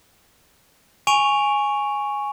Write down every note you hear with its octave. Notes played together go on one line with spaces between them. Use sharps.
G#5 C#6 D7 D#7 F7